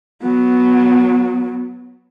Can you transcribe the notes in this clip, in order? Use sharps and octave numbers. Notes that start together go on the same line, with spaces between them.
F#3 B3